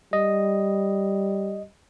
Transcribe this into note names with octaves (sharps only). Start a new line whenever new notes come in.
G3 D#5